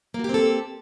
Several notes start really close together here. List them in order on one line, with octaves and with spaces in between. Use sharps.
A#3 F#4 G4 C4 A4